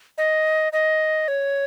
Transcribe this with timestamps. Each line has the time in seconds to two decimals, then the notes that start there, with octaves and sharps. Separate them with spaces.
0.18 D#5
0.73 D#5
1.28 C#5